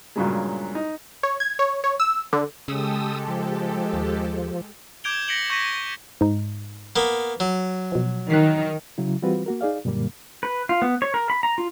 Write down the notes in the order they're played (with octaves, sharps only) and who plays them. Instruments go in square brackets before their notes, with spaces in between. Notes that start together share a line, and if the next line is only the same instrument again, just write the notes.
[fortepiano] G2 A#2 C#3 F#3 G#3
D#4
[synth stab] C#5
G#6
C#5
C#5
E6
D3
[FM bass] C#3 [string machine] G#3 G4 A4 [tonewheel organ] D#6 E6
[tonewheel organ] F3
[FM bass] D#2
[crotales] D6 G6 G#6 D7 F7 G7
A#6 B6 C#7 D7 F#7 G7
C#6 G6 G#6 A#6 B6 D#7
[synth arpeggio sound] G#2 D#4
[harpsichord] A#3 B3
F#3
[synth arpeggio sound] B2 F3
[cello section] D#3 [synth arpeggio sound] F#6 B6 C7
[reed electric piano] C#3 F#3 E4
E3 G3 C4 F4 F#4 B4
A#3 F#4 A#4
D#4 G#4 D5 F5
F#2 A#2 D3 G3 A#3
[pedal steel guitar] B4
F4
B3
C#5
A#4
B5
A#5
F4